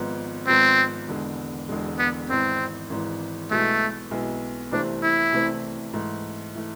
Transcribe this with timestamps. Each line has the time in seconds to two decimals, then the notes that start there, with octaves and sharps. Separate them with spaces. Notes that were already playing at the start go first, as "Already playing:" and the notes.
Already playing: G#1 G#2 F3 B3
0.47 G#1 G#2 F3 B3 C4
1.08 E1 E2 D3 G#3
1.69 E1 E2 D3 G#3
1.99 B3
2.29 G#1 G#2 E3 C4
2.90 G#1 G#2 E3
3.51 B1 B2 G#3 A3 B3 E4
4.11 B1 B2 G#3 B3 E4
4.71 C2 C3 E3 A3 C4 D4
5.03 E4
5.32 C2 C3 E3 A3 C4
5.93 G#2 E3 A3
6.55 E3 A3